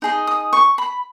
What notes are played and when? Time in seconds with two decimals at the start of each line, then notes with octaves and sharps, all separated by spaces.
0.02 D#4 G#4 D#5
0.27 D#6
0.53 C#6
0.78 B5